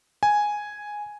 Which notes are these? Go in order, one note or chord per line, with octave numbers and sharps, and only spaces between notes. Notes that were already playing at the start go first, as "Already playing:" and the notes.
G#5